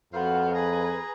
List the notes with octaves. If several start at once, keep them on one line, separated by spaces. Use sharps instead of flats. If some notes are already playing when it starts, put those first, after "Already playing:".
F2 B3 F4 F#4 C5 F5
G#4 B4 G#5 A#5